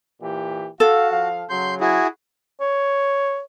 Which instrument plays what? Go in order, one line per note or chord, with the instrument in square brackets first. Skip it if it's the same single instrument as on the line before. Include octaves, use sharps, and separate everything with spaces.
[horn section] A#2 E3 G4
[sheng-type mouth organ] F#4 [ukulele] A4 [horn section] F5
[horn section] F3 F5
[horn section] C#3 F#3 [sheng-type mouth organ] C6 G6
[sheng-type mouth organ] E4 F#4 G#4
[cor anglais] C#5